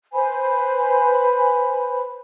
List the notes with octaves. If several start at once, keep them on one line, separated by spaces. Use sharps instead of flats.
B4 C5 G#5 B5